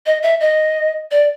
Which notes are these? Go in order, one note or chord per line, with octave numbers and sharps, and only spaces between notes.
D#5
E5
D#5
D5